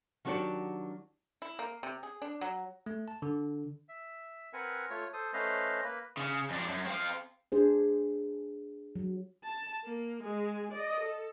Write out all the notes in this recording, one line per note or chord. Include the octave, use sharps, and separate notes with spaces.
D#3 F#3 D4 F#4 G4 D5
E4
A#3
C3
G#4
D4
F#3
A3
A5
D3
E5
C4 A#4 B4 F#5 G#5
A3 F4 C#5
A4 C5 D#6
A3 C#4 B4 C5 D#5 F5
A#3 B4
C#3
F2 D4
F#2
C4 F5
D4 G#4 C5
F#3
A5
A#3
G#3 G#5
D5 D#5
A4